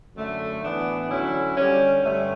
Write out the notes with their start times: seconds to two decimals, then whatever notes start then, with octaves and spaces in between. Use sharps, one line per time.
0.15 F#2 D3 A3
0.61 A2 E3 B3 D4
1.08 D3 F#3 C#4 E4
1.55 D3 G3 C#4
2.02 G2 D3 A3 C#4